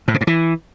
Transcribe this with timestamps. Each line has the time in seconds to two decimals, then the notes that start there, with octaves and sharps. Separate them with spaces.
0.08 A2
0.14 C#3
0.21 G2
0.27 E3